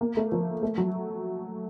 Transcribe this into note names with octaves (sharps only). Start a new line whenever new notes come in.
A#3
A3
F3
A3
F#3